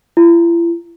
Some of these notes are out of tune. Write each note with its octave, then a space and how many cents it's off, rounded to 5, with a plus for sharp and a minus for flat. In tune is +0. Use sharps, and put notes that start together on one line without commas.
E4 +45